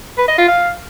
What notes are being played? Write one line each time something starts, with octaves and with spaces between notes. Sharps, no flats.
B4
D#5
F4
F5